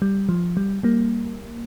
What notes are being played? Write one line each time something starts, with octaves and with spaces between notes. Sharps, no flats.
G3
F3
G3
G3 A#3